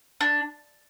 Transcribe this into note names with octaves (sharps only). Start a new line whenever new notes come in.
D4